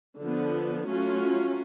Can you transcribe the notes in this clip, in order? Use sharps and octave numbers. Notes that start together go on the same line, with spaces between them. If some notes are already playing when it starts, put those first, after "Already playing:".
D3 F3 B3
F#3 A3 C#4 F4